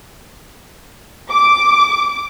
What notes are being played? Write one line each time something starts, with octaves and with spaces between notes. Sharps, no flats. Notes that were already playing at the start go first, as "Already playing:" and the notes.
D6